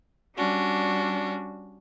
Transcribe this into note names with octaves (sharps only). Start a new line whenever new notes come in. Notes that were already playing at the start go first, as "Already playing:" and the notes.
G3 C#4 D4 F#4